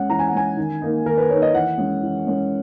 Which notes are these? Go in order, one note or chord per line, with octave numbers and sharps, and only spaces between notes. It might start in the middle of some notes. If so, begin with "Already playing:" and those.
Already playing: G#3 C#4 F#5
E3 A#5
G#5
F#5
G#3 C#4 G#5
D#3
A#3 D#4
D#3 A#4
B4
A#3 D#4 C#5
D#5
E3 F#5
G#3 C#4
E3
G#3 C#4